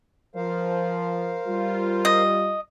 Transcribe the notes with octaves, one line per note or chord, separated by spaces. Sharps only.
F3 A#4 C5 F5
G3 F4
D#5